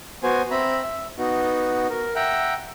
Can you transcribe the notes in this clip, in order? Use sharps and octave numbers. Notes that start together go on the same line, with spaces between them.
B3 F#4 C5 G#5
C4 E5 A#5 B5
E5
B3 D#4 F#4
A#4
E5 F#5 G5 A#5